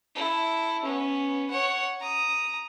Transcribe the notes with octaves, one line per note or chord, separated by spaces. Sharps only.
E4 A4
B3 C#4
C#5 F#5
A#5 D#6